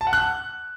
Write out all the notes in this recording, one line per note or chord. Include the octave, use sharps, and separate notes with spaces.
A5
F#5
F#6